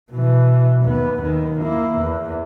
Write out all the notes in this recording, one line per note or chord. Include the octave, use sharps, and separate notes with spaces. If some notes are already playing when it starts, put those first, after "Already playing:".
B2 E3
D#2 B3
D#2 D#3
A#3 E4
E2